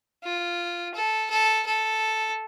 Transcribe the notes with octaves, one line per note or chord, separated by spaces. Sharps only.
F4
A4
A4
A4